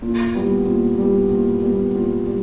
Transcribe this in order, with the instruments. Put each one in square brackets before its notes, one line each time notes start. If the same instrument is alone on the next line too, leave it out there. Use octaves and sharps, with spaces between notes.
[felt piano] A#2
G3 B3
A#2
G3 B3
A#2
G3 B3
A#2
G3